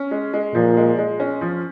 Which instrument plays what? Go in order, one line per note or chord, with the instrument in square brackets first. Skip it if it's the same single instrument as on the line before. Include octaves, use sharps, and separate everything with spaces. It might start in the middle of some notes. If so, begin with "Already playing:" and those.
Already playing: [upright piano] C#4
G#3
G#3
[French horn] A#2 [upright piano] F3
[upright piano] G#3
G#3
C#4
F3